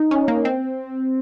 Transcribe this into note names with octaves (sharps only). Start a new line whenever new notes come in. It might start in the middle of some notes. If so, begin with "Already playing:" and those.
Already playing: D#4
C#4
A#3
C4